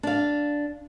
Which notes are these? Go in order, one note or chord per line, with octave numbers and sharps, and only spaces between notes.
D4 F5